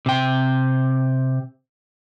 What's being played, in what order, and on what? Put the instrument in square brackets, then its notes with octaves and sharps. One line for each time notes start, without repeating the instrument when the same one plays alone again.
[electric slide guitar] C3 G5